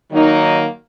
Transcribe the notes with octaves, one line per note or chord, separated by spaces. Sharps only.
D#3 F#3 A#3 D#4